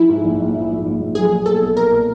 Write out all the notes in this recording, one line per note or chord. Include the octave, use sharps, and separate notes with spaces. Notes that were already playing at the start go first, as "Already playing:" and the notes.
Already playing: F3 E4
G#2
A#1
A#1
F3
G#2
A#1
A#1
F#3 G#4
A#2
B1 A4
B3
F#3 A#4
A#2